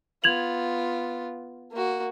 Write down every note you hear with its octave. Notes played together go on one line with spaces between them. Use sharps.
B3 F4 G#6 F7 F#7
A#3 F#4